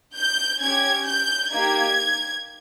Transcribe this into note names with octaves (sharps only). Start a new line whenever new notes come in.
G6
C#4 G4 G#6
G6
A#3 D#4 G4 G#6